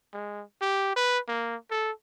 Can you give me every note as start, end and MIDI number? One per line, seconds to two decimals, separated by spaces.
0.14 0.43 56
0.61 0.94 67
0.96 1.19 71
1.28 1.56 58
1.71 1.91 69